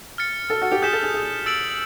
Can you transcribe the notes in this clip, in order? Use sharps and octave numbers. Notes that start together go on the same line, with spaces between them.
F6 A6 C#7
A4
F#4
G4
G#4 D#6 G6 B6 E7 G7
A4
G#4
G#4
E6 A6 D7 F#7